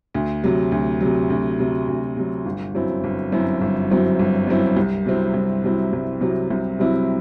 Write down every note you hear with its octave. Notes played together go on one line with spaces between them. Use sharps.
D2
C3 F#3
D2
C3 F#3
D2
C3 F#3
D2
C3 F#3
G1
F#2 F#3 C4 E4
G1
F#2 F#3 C4 E4
G1
F#2 F#3 C4 E4
G1
F#2 F#3 C4 E4
C2
C3 F#3 C4 E4
C2
C3 F#3 C4 E4
C2
C3 F#3 C4 E4
C2
C3 F#3 C4 E4